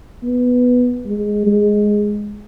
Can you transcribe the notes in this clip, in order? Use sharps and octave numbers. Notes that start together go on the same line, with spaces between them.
B3
G#3
G#3